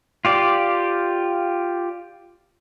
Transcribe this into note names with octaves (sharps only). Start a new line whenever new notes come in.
F4 G4 D5